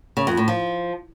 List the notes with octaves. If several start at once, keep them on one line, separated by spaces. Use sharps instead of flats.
C#3
F2
A2
F3